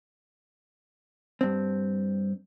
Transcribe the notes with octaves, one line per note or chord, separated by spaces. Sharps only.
G2 C4